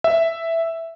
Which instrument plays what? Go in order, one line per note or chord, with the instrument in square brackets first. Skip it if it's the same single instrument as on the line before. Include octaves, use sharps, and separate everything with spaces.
[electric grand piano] E5